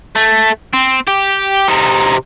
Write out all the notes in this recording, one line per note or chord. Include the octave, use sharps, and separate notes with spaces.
A3
C4
G4
C3 D#4